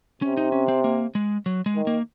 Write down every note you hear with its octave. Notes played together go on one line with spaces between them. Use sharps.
C3 C#4
D#4
C#4
C4
A#3
G#3
F#3
G#3
D#3
A#3